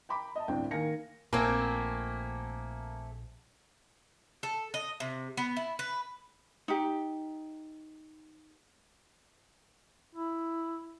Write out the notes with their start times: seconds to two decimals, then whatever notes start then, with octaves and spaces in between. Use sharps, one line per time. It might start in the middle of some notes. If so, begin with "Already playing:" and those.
0.09 G5 A#5 B5 D6
0.35 D#5 E5 A5
0.48 G1 D2 A2 C4 D4 G5
0.71 D#3 A#3 F5 G#5 A#6 C#7
1.33 A#1 A#2 A3 A#3 C4 G#5 D6 G#6
4.43 A4
4.74 D#5
5.00 C3
5.37 B3
5.56 E4
5.79 B4
6.68 D#4 G4
10.15 E4